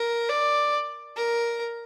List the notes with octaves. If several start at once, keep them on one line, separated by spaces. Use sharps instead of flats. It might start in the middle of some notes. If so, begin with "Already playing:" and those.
Already playing: A#4
D5
A#4